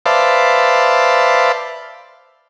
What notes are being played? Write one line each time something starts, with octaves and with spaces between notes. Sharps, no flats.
B4 C5 D5 E5 F5 A5